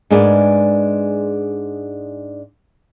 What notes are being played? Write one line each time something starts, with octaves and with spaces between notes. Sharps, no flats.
G#2 G#3 D4 A#4 B4 D5